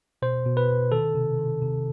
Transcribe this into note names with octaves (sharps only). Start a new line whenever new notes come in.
B2 C5
B2
B4
B2
D#3 A4
C3
D#3
C3